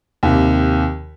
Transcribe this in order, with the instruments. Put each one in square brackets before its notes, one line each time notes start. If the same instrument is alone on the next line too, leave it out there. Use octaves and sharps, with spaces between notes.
[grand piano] D#2 C3